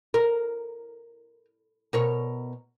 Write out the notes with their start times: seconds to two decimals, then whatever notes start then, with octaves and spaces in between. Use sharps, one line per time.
0.14 A#4
1.93 B2 A#4 C#5